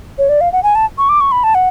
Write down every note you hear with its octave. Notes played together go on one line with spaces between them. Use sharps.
C#5
D5
F5
F#5
G#5
A5
C#6
D6
C#6
B5
A5
F#5